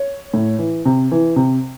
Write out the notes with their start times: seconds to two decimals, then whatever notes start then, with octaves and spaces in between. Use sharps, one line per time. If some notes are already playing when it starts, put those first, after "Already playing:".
Already playing: C#5
0.34 A2
0.59 E3
0.86 C3
1.11 E3
1.36 C3